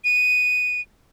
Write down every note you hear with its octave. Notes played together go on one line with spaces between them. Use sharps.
D#7